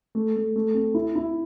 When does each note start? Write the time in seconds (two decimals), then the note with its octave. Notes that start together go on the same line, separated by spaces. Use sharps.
0.15 A3
0.36 A3
0.56 A3
0.75 C4
0.94 E4
1.16 E4